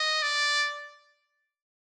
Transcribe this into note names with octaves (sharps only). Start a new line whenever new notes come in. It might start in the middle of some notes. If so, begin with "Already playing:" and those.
Already playing: D#5
D5